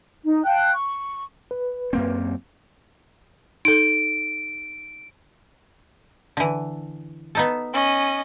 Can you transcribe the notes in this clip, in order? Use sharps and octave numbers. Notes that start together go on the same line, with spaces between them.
D#4
F5 G5 A5 F#6
C#6
B4
F#2 A#3 C4
D#4 A4 D7
D3 E3
B3 D#4 A4
C#4 D#5